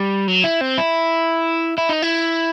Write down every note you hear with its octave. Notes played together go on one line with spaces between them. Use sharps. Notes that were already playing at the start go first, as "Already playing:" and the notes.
Already playing: G3
F#3
E4
C4
E4
E4
D#4
E4